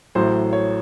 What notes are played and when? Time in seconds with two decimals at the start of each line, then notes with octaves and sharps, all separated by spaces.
0.15 A1 A2 F#3 C5
0.53 C#5